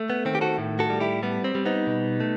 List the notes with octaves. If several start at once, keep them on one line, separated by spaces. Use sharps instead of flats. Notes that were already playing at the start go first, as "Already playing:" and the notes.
Already playing: A3
B3
D#3 C4
G4
F#4 A4
A2
F#4 A4
G3
E4 G4
G3 B3
C4
G3
B3 D#4
B2
A3